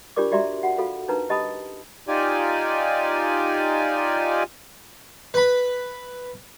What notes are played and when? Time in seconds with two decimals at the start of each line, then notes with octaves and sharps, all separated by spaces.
0.16 D4 F4 G4 A#4 D5 D6
0.31 F#4 G4 D5 E5 A#5 C6
0.63 F#4 F#5
0.78 F4 F#4 A4 F5
1.08 D4 D#4 A#4 B4 A5 A#5
1.29 C#4 G4 D#5 A5 B5 D#6
2.08 D#4 F4 G4 D5 G#5
5.34 B4 B5